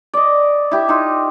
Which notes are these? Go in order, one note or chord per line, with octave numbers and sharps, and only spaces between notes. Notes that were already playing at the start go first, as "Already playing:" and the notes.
D5 D#5
E4 G4
D#4 F4